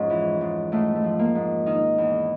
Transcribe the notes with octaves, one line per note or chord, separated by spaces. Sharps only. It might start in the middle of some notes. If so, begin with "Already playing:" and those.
Already playing: F2 G#2 C#4
E3
G#2
G#2 A3
A3
F3
A#3
G#2
D#3 D#4
E2